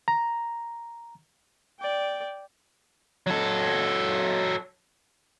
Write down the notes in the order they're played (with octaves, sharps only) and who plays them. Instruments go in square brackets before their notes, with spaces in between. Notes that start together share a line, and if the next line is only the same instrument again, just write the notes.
[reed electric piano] A#5
[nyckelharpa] D5 G5
[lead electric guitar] F#3 A4